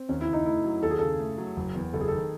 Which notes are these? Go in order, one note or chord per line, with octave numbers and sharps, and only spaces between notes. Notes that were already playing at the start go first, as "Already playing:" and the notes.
Already playing: C4
D#2 C#4
E4
C#3
D#4
A3 E4
F#3
D#2 A4
G#4
C#3 A4
A3
F#3
F#1
E2
F#1 A4
G#4
A4
D#3